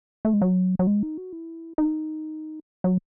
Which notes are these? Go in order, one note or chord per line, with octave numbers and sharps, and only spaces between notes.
A3
G#3
F#3
F#3
G#3
D#4
F#4
E4
D#4
F#3